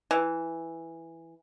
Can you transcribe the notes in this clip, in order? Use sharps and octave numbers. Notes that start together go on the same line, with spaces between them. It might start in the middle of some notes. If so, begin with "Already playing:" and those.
E3